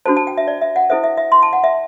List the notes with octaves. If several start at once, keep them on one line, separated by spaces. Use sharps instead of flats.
D4 F#4 A4 C5 A5
A5
G5
E5
D5
E5
F#5
E4 A4 C5 E5
E5
E5
C6
A5
F#5
E5